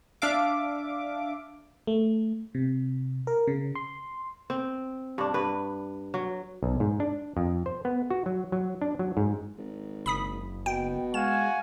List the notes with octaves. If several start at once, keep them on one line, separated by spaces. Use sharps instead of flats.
D4 E5 F5 D6
A3
C3
A#4
C#3
C6
C4
G2 D4
G2 B4
F#3
B1
G#2
D4
F2
C5
B3
F#4
F#3
F#3
D4
F#3
G#2
G#1
F#1 B5 D#6 B6
B2 G5
G#3 F#4 F5 G#5 E7